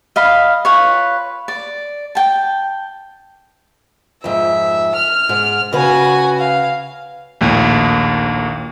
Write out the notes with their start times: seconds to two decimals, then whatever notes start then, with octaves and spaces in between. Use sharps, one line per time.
0.16 D#5 F5 B5
0.65 F4 B4 C#5
1.48 D5
2.15 G5 A5
4.24 F2 G#2 E5
4.96 F6
5.29 G#2
5.73 C#3 F#4 B4 G#5
6.39 F5
7.41 A#1 D#2 A2